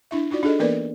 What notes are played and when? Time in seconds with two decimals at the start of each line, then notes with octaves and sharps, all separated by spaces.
0.11 D4 E4 E5
0.31 D#4 F4 F#4 D5
0.43 D4 G#4 A4 D#5
0.59 E3 A#3 B3 A#4 B4 D5